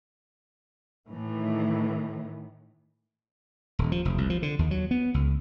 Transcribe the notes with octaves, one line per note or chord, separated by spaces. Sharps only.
A2 D#3 E3
D#1
F3
F1
C2
F3
D3
D#2
F#3
B3
C#2